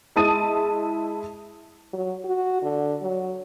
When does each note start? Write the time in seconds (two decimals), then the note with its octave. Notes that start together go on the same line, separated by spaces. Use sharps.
0.16 G#3 E4 A5 D#6 D#7
1.93 F#3
2.25 F#4
2.63 D3
3.02 F#3